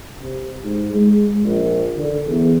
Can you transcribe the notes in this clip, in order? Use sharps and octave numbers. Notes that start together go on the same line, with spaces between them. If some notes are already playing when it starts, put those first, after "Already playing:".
C3
G#2
G#3
A#1
D3
E2